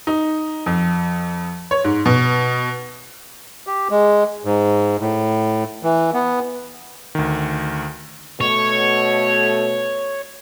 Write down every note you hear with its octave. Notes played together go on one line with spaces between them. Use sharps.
D#4
F2
C#5
G#2
B2
G4
G#3
G#2
A2
E3
B3
D2 D#3
B2 A3 C#5